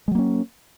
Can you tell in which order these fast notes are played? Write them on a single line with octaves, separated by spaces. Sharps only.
G#3 F#3 A#3 C#4